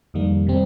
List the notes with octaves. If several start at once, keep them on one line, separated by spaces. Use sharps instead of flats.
F2 D#3 G3 A#3
C3 G3 C4